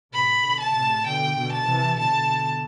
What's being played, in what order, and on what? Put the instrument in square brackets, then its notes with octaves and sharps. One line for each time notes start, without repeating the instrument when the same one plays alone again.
[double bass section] A2 C3 [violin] B5
[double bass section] B2 D3
[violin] A5
[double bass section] A2 C3
[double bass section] B2 D3 [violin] G5
[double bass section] B2 D3
[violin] A5
[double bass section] C3 E3
[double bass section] B2 D3 [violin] A5